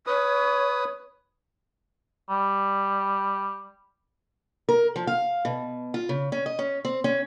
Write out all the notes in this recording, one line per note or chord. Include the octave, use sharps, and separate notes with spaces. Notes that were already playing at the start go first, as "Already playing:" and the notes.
B4 C#5 D#6
G3
A#4
F3
F5
B2
F4
C#3
C#4
D#5
C#4
C4
C#4